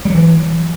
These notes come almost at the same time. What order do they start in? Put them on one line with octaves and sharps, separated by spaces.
G3 F#3 E3